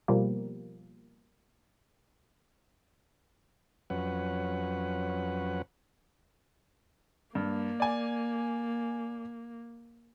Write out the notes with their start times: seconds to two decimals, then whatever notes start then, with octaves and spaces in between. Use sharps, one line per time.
0.08 B2 F3 G3 A#3
3.90 F2 F#3 C#4 B4 F#5
7.35 G2 A#3
7.80 D5 G#5